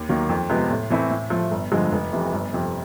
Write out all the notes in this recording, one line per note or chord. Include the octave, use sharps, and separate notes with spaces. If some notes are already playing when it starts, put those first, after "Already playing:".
Already playing: D#2
D#3 F#3 A#3
F2
C3 F3 G#3 B3
A2
E3 A3 C4 E4
A2
F3 A3
G1
G2 D3 F3 G#3
F1
F2 C3 E3
G1
F2 C3